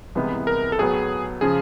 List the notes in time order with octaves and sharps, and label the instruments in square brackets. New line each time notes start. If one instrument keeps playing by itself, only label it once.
[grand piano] C2 C3 E3 G#3 B3
[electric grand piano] A#4
A4
[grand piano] A2 F#3 B3 [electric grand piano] G#4
[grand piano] C#3 F3 [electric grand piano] G#4